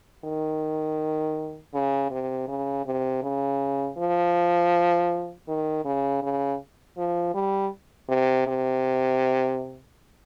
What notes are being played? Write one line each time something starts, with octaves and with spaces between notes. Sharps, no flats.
D#3
C#3
C3
C#3
C3
C#3
F3
D#3
C#3
C#3
F3
G3
C3
C3